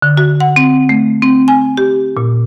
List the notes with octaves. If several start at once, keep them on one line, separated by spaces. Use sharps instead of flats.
D3
F#4
F#5
C4
A3
C4
G#5
G4
A#2